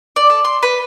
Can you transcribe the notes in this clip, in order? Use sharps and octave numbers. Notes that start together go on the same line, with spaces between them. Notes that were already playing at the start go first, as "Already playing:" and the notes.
D5
A4
C6
B4